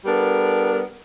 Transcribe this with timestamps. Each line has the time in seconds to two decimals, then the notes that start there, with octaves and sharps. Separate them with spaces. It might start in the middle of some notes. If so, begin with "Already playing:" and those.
0.05 G3 B3 D4 A4 A#4